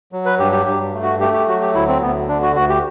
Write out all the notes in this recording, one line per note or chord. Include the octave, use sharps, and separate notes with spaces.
F#3
B4
G2 G4
G4
G2 G4
A3
F#4
A3 G4
G4
F#3 F#4
G4
D2 E4
C4
D2 B3
D3 D4
F#4
D2 F#4
G4